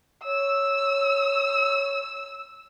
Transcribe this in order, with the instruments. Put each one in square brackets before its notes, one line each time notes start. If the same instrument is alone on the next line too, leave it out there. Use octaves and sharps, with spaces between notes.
[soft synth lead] C#5 [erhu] E6